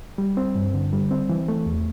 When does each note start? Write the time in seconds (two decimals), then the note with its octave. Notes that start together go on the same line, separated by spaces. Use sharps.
0.18 G3
0.37 C4
0.55 G2
0.74 D3
0.93 G3
1.11 C4
1.29 E3
1.48 A3
1.66 E2